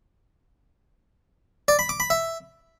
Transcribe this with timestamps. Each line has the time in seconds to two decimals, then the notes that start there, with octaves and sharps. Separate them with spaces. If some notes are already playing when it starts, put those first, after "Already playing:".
1.68 D5
1.79 B5
1.89 D6
2.00 B5
2.10 E5